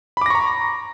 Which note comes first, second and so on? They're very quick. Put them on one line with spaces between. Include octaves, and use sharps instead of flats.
B5 D6 A#6 C#6 A#5